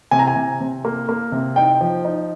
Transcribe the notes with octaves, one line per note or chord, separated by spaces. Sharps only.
C3 G#5
A#5
G#5
C3
C3
A#3
A#3
C3
D#4 G5
F3
D#4